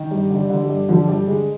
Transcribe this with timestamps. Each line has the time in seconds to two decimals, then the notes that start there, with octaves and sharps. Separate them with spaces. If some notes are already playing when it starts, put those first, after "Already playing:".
Already playing: D#3
0.11 G2 G3
0.30 D3
0.36 G3
0.50 D3
0.63 G3
0.70 G2
0.89 D3 F3
1.08 G2 G3
1.27 D3 G#3